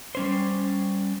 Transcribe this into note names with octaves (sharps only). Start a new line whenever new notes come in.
G3 C#4 C5